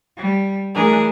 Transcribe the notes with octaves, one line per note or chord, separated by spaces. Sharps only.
G3
E3 A3 D4 G#4 A#4